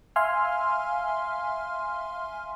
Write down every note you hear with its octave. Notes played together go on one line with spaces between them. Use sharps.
E5 F5 G#5 C6 F6